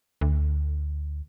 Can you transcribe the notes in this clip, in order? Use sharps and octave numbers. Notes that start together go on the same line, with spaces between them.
D2